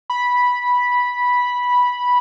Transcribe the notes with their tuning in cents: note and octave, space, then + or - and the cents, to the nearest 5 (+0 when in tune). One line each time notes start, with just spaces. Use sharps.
B5 -10